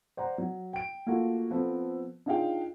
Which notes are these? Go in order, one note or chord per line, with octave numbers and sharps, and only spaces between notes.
C5 D5 F#5 A#5
F#3
G5 D7
A3 A#3 F4 F#4
F3 B3 C4 A4
D4 D#4 F4 G#4 F5 G5